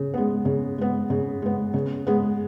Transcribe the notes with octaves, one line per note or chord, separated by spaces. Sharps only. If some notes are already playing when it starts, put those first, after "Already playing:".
Already playing: C#3
G#3 B3
C#3
G#3 B3
C#3
G#3 B3
C#3
G#3 B3